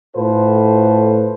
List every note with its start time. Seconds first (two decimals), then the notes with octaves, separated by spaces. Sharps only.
0.16 A2 F4 A4 B4 C5